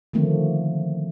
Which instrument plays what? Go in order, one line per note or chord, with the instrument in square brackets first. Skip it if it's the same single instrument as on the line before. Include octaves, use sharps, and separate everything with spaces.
[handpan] D3 D#3 F3 A3 A#3 C4